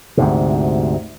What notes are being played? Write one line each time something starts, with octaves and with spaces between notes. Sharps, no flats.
D2 G#2 C3